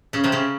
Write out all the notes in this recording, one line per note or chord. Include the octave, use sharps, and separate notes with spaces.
C#3 C#4
C3 C4
C#3 C#4